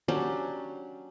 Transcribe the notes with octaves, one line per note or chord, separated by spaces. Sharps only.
F#3 C#4 D4 G4